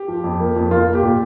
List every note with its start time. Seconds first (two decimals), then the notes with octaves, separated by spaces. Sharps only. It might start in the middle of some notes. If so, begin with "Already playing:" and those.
Already playing: G4
0.08 F3
0.24 F2
0.40 A#3
0.56 F2
0.71 A#3 F4
0.87 A#3
0.95 G4
1.03 A#2